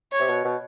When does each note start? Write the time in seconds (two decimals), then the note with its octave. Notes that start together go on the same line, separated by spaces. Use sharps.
0.12 C#5
0.19 C3
0.29 B2
0.45 B2